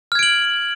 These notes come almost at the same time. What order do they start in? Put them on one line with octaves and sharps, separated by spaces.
F6 G#6 D7 F#7